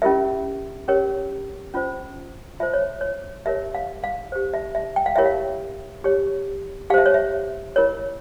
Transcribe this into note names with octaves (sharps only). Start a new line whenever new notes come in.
C#4 E4 G4 A#4 E5
C#4 G4 A#4 C#5
C#4 F4 C5
F4 C5 E5
C#5
C#5
G4 A#4 C#5 E5
F5
F5
G4 C5
E5
E5
G5
F5
E4 G4 A#4 C#5 E5
F5
G4 C#5
G4 C5 E5 F5
C#5
E5
E4 A#4 C#5